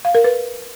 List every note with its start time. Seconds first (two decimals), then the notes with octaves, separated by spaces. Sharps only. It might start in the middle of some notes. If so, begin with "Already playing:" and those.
0.05 F5
0.15 A#4
0.24 B4